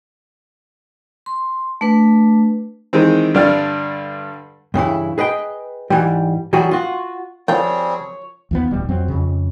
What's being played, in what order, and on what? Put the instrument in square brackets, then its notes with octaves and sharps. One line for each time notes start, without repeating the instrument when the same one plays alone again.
[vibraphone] C6
A3 D4 B4
[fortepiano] D#3 E3 G#3 C4
G2 D3 D4 D5 F6
[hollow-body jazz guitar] G2 C#3 E3 E4
G#4 B4 D#5 G5
G#2 E3 G3
E3 F#3 G3 F#4 G#4
F4 F#4
[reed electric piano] F3 A5 [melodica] G3 C4 G#4 [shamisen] F4 G5 [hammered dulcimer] C#5
[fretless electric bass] D#2 F3 B3
D1 G3
F2 F#3 C4
F2 C#3